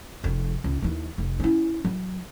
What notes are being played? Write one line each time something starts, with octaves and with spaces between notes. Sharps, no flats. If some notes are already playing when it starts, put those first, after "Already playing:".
F1 F2
C#2
D#2 E3
F1
C#4 E4
F#3